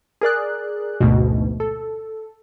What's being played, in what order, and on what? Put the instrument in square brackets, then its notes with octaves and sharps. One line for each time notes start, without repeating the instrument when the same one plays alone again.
[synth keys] G#4 A#4 D5 F#6
A1 D2 G#2 B2
A4